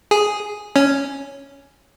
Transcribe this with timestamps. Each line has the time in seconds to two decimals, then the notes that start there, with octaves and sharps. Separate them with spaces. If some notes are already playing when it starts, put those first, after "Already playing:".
0.11 G#4
0.76 C#4